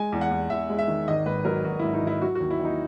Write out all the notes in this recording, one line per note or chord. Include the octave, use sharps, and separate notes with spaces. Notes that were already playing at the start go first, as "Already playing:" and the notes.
Already playing: G#3 G#5
E2
F#5
E2
E2 E5
G#3
E5
D#3
G#1 D#5
G#2 B4
F#3 A#4
G#1 F#4
G#2 E4
D#4
G#1 E4
F#3 F#4
D#2 F#4
E4
D#2
D#4